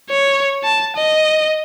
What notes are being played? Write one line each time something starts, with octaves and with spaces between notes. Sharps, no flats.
C#5
A5
D#5